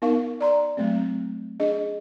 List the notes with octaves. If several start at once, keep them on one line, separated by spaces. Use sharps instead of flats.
B3 D#4 A#4 F5 C#6
D5 A#5 C6
F#3 A3 C4
D4 G#4 D#5